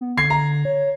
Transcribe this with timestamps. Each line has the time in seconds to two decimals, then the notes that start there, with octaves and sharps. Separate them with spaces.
0.01 B3
0.18 D3 G#6 C7
0.30 A#5
0.65 C#5